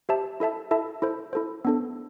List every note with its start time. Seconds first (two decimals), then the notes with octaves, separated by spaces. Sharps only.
0.09 G4 C5 E5 A5
0.40 E4 A4 E5 A5
0.71 E4 A4 E5 A5
1.02 E4 A4 C5
1.33 E4 A4 C5
1.65 B3 D4 A4